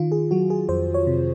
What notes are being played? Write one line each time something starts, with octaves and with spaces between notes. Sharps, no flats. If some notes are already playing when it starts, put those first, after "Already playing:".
Already playing: D#3 F4
G#4
F#3 F#4
G#4
F2 C5
C#5
C3